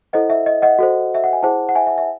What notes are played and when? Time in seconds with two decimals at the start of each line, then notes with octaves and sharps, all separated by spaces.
0.13 E4 A4 C5 D#5 F#5
0.30 E5
0.46 D#5
0.62 D#5 F#5
0.79 F#4 A4 C5
1.15 E5
1.24 F#5
1.33 G#5
1.43 E4 G#4 C5 F#5 A5
1.69 F#5
1.75 E5 G#5
1.87 E5
1.98 E5